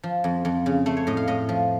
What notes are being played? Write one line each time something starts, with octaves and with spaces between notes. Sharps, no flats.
F3
F2
F2
C#3
A3 C5
C#5
A2 D#5
F5
A2 D#5
F3